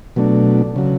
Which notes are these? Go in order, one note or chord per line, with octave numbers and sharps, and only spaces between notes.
B2 F#3 A3 D4
C#3 F#3